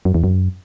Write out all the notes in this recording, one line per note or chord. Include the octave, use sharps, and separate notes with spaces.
F#2
E2
F#2